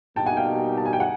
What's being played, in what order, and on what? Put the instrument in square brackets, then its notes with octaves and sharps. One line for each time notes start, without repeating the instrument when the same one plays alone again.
[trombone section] B2 G3 A#3 D#4 G4 [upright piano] G5 A5
[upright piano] F#5 G#5
F5 G5
A5
G#5
G5
F#5 G#5